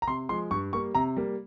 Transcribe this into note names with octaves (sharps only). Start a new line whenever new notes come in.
A#5
C3 C6
F3 G#3 C6
G2 C#6
G3 A#3 C#6
C3 A#5
G3 A#3